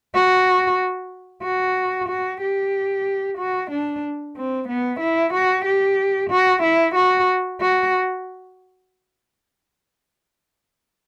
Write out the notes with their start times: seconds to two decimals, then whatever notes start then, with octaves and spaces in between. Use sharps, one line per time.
0.14 F#4
1.43 F#4
2.09 F#4
2.42 G4
3.38 F#4
3.71 D4
4.36 C4
4.68 B3
5.00 E4
5.34 F#4
5.65 G4
6.30 F#4
6.63 E4
6.95 F#4
7.61 F#4